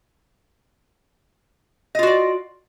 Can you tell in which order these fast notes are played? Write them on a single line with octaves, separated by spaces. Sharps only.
D#5 F4 F#4 D5